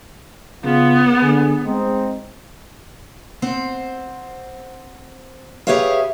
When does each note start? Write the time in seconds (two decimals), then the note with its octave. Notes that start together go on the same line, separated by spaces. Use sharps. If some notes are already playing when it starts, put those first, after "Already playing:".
0.64 C#3 B3 F4
1.22 D3 G#4
1.66 G#3 C4 D#4
3.42 C4 C5 F#5
5.67 G4 G#4 B4 C#5 E5 F5